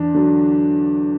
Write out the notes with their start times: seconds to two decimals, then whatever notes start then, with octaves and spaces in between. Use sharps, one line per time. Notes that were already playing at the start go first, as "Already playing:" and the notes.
Already playing: E2 D4
0.14 D3 F#3